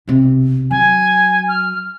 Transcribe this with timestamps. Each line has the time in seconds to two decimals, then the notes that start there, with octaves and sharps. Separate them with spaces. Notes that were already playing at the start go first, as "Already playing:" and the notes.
0.08 B1 C3
0.71 F#3 G#5
1.49 F6